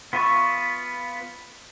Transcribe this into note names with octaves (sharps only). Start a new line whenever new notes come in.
B3 F4 B4 E5 C#6